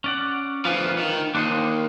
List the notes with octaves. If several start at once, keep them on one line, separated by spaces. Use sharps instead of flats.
C#4 D5 F#5
D2 F3 F4 B4 G#5
D#3
D#2 D4 C5 D#5